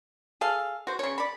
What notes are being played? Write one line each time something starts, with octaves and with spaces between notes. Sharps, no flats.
G#4 A4 F5
F#4 C5
C#3 C#5
D5 B5